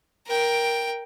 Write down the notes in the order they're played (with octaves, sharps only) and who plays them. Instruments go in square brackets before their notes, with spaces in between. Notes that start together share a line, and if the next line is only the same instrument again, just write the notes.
[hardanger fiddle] A#4 G5